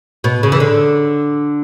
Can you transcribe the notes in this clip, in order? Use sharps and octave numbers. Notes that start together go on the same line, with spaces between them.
B2
C#3
E3
D3